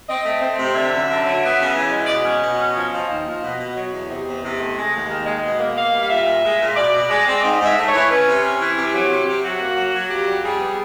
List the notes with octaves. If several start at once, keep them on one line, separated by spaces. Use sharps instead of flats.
C4 D#5
A3
C4
C3
D3 E5
F#2
D3
F#3
B3
C#3
E3
G#3
D5
B2 D#5
C#4
B2
C#4
F3 D#5
F3
D#2
F3
B2
B2
F#3
E2
C3 D#5
E2
C3
A3
G#3
D#2
D#3
G#3
B2
A#3
A#3 F5
G3
F5
A#2 E5
A#2
G#3
A#2
B2 D5
B2
G#3 D5
C4
G#2 D#5
G#2
E5
A3
E3 C#5
C#4 B4
C3
C#4
E3
C3 G4
F#3
C3
C3
F#3 F#4
A#3
F#3
F#3
F2 G4
G3
G3 G#4
B3